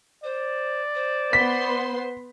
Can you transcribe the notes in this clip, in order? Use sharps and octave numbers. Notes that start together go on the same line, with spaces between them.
C5 D5
C5
B3 C6 B6